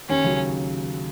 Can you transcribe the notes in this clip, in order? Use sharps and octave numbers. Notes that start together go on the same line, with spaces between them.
D#2 C#4
C#3 F#3